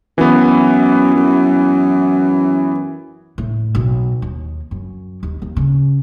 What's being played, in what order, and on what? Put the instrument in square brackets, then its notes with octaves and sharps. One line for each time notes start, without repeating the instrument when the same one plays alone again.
[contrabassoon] F#2 [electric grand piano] E3 B3
[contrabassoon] F#2
[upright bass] A2
B1
D#2
F#2
D#2
D#2
C#3